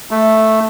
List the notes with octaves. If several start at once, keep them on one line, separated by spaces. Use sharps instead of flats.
A3